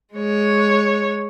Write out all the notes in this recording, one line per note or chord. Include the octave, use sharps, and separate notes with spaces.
G#3 C#5